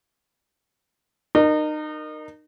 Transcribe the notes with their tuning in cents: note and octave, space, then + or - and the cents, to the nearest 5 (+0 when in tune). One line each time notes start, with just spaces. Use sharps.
D#4 -30 A#4 +0